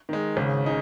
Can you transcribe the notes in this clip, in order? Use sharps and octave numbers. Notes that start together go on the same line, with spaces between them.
D#3 G#3
G#1 C#3
G#3 D#4